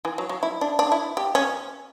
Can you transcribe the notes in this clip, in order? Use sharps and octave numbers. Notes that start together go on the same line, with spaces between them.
E3
F#3
F#3
E4
D4
D4
E4
G4
C#4